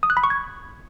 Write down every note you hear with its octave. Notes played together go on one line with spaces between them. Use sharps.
D#6
F#6
B5
C#6
G#6